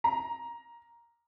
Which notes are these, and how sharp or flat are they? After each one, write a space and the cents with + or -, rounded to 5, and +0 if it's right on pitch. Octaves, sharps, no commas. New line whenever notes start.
A#5 +10